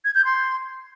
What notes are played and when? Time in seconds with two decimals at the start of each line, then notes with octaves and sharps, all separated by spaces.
0.05 G#6
0.15 G6
0.25 C6